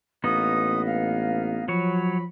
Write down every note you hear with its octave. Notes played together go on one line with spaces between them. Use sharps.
A1 A#3 B3 D#4 D#6
F5
F3 F#3 C#5 B5